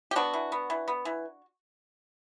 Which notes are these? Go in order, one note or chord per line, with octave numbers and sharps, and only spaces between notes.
G4
B3 D4 F#4
E3
B3
E3
B3
E3